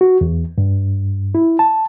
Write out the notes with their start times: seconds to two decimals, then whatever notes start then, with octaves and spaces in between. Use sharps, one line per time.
0.01 F#4
0.21 E2
0.58 G2
1.35 E4
1.59 A5